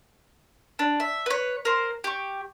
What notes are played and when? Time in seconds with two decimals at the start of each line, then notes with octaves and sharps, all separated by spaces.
0.79 D4
1.00 E5
1.26 B4 C#5
1.65 A#4 C5
2.04 G4 C#6